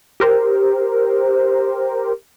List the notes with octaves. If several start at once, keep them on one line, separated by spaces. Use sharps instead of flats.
G4 A#4 C5